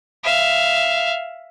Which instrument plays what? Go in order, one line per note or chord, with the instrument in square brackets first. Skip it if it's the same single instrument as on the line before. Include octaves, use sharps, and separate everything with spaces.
[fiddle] E5 F5